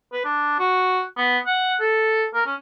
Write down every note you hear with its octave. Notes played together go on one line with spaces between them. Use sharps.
B4
D4
F#4
B3
F#5
A4
A#4
C#4